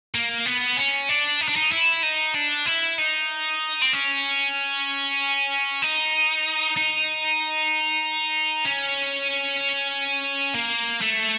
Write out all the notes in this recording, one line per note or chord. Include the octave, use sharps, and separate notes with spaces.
A#3
B3
C#4
D4
D#4
D4
D#4
E4
D#4
D4
E4
D#4
C4
C#4
D#4
D#4
C#4
A#3
A3